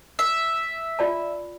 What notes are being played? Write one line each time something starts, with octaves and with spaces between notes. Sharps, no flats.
E5
F4 D5 A5